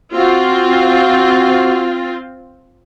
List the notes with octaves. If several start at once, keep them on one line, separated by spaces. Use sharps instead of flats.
C4 F4 F#4